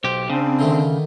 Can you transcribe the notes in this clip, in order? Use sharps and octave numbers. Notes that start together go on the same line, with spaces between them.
B1 G4 C5
C#3 C4 D4
D3 D#3 A3